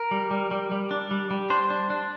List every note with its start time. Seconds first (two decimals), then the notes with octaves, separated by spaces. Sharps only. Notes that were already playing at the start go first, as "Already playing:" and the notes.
Already playing: A#4
0.11 G3
0.31 G3
0.51 G3
0.71 G3
0.91 D4
1.11 G3
1.31 G3
1.50 D4 C5
1.70 D4
1.90 D4